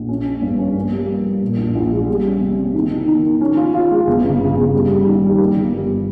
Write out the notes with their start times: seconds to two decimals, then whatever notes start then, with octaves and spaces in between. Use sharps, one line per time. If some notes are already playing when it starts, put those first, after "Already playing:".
Already playing: A#1
0.09 C#4
0.26 C#4
0.42 G2
0.59 C#4
0.75 A#3
0.92 G3
1.08 A#3
1.25 G3
1.42 A#2
1.58 A#1
1.75 A#1
1.91 G#3
2.08 G3
2.25 C#4
2.41 C3
2.57 C3
2.74 D#3
2.91 D#3
3.07 D#3
3.24 D#3
3.41 C#4
3.57 F4
3.74 F4
3.91 G#3
4.07 G1
4.24 C#3
4.40 C#3
4.56 C#3
4.74 G3
4.90 G3
5.06 D#3
5.23 G3
5.39 A#3
5.56 G1
5.72 G3